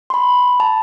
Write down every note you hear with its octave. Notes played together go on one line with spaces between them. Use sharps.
C6
B5
A5